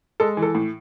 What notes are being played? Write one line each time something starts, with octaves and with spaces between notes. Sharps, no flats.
G#3 A4
E3
A4
A2